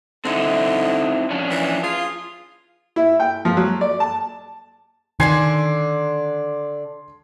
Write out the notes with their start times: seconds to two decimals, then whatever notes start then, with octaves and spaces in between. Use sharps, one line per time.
0.25 D3 C4 D#4 E4
1.30 F3 C#4 D4
1.51 E3
1.83 F4 G#4
2.96 E4
3.20 G5
3.45 F3
3.57 F#3
3.81 D5
4.00 A5
5.20 D3 D#3 D4 G#5 C6 G#6 C7